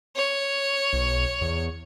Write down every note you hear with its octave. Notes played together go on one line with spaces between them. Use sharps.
C#5
B1
E2